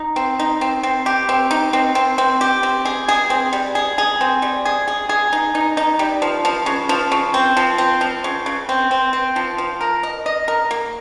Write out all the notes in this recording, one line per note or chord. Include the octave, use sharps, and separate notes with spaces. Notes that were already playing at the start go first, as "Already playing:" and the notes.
Already playing: D#4
C4
D#4
C4
C4
G4
C4
D#4
C4
C4
C4
G4
C4
G#4
G#4
C4
G3
G#4
G#4
C4
G3
G#4
G#4
G#4
D#4
D#4
D#4
G3
F3
F3
C#3
F3
C#3
C4
F3
C4
F3
C#3
C#3
C4
C4
C4
F3
F3
A#4
D#5
D#5
A#4
A#3